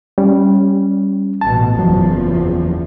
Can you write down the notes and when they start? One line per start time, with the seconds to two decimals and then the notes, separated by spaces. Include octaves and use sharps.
0.18 G3 C#4
1.41 A1 B2 A5
1.79 F#1 E2 F3 F#3